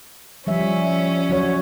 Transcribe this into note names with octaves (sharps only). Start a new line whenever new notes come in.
F3 G3 C#4 E5
F#3 F#4 C#5